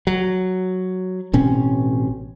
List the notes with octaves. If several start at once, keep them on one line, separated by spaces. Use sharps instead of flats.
F#3
A1 B2 C4 C#4